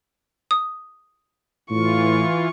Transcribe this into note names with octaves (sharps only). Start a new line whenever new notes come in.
D#6
A2 E3 F4 C#6